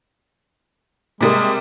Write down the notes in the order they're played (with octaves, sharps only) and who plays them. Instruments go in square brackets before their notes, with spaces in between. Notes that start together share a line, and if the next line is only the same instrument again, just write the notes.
[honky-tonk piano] C3 G3 A#3 [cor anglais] G#3